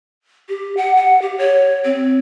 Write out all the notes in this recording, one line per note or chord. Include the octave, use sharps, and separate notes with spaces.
G4
F#5
F#5
G4
C#5
C4